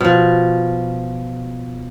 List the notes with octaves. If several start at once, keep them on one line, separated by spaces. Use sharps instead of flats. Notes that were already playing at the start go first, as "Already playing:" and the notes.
B2 F3